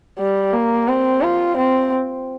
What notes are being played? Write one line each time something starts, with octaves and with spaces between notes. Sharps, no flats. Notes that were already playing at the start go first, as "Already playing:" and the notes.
G3
A#3
C4
F4
C4